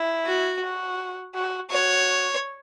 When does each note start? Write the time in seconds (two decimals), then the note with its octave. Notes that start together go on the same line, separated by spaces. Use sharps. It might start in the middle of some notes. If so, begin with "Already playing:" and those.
Already playing: E4
0.26 F#4
0.63 F#4
1.35 F#4
1.71 F#4 C#5